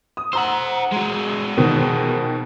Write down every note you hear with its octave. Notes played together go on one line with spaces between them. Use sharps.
D#6
C5 F#5 A#5 E6
G#3 F#4
B2 D#3 F3